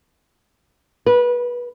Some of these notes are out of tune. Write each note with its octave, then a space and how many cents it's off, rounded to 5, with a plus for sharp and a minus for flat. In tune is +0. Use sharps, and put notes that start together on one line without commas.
B4 -25